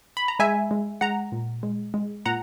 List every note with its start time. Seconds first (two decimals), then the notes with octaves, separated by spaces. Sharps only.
0.17 B5
0.28 A#5
0.39 G#3 E5 G#5
0.71 G#3
1.01 G#3 F#5 A#5
1.32 A#2
1.63 G#3
1.94 G#3
2.26 A#2 F#5 A#5